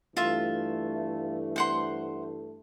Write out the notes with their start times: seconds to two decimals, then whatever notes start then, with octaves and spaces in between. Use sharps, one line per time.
0.17 G2 E3 A3 F4 E5
1.56 C5 F#5 C6